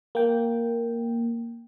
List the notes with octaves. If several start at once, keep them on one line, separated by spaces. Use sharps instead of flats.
A#3 G5